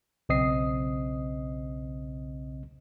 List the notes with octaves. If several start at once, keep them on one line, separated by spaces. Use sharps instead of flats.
B1 C#3 C4 D#5 D#6 C7